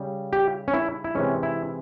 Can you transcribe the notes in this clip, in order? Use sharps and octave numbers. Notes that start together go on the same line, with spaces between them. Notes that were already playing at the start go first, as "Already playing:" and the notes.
Already playing: C#3 G3
G4
C#4
E4
E4
C3 E3 G#3 C#4
E4